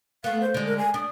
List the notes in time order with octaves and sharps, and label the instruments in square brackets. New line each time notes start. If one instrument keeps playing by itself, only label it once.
[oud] A3 B3 [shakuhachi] F5
[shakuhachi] C5
[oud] D3 G#3
[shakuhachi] A#4
G#5
[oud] D4 [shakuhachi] D#6